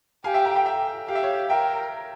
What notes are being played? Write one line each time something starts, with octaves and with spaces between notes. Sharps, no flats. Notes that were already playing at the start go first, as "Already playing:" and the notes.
G4 F5 G#5
E5 G5
G5 A#5
G5 A#5
E5 G5
G4 F5
E5
C#5 F5
A#4 E5 G5